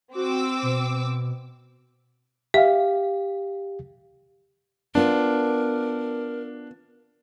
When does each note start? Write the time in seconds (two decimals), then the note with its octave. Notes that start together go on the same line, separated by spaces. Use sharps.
0.15 C4 F#4 D6 E6
0.62 B2
2.54 G4 E5 F5
4.95 B3 D4 F4 A#4